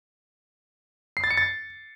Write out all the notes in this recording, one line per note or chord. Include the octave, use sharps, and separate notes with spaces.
C7
A6
C#7
A6